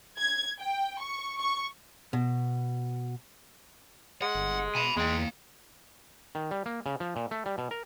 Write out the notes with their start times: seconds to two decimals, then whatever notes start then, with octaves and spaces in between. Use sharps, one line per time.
0.18 G#6
0.59 G5
0.99 C#6
1.39 C#6
2.13 B2
4.22 G#3 F#5
4.35 G1
4.75 B2 G#5 B5
4.97 E2 G#3 A#3 G5
6.35 D#3
6.51 G3
6.66 A#3
6.86 C#3
7.00 F3
7.16 A#2
7.31 A3
7.46 G3
7.58 B2
7.71 A#4